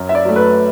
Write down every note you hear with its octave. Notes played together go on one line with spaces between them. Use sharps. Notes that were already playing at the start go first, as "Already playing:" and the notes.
Already playing: F#2
E5
D5
F#3 A3
B4